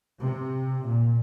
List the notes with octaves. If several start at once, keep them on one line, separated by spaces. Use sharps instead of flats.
C3
A#2